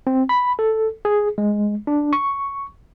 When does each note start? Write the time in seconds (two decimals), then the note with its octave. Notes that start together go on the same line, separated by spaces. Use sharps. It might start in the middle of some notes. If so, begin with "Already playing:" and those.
0.07 C4
0.29 B5
0.59 A4
1.05 G#4
1.38 G#3
1.87 D4
2.13 C#6